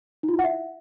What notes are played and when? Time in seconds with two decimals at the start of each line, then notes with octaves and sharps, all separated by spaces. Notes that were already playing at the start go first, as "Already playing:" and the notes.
0.23 D#4
0.28 F4
0.34 E4
0.39 F#5
0.44 E5